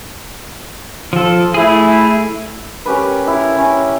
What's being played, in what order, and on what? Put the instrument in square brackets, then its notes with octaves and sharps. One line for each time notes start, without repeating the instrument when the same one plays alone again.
[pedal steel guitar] F3 A4
[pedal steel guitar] A3 G#4 [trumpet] E4
[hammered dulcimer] C#4 G4 A#4 B4
E4 A#4
C#4